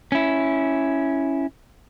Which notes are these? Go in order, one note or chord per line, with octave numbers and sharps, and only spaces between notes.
C#4 E4